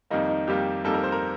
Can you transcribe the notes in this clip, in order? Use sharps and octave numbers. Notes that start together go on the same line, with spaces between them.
F2 D#3 G3 A#3 D#4
D#4
F2 D#3 G3 A#3 G4
F2 D#3 G3 A#3 A4
A#4
C5
A#4